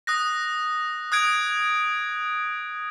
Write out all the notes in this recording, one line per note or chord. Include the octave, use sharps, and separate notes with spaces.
D#6 F#6 A#6
D#6 F#6 G#6 D7